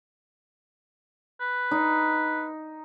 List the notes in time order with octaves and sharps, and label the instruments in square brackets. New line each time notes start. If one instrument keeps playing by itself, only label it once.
[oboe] B4
[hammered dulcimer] D#4